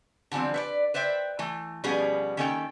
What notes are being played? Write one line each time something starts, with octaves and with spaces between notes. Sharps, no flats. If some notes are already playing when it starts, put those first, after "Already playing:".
D3 E3 F3 G3 C4
B4 C#5 D5
B4 C5 D5 E5 G5
E3 A3
B2 F3 G3 B3 C#4 G#4
D#3 A#3 C#4 A4 A#4 G5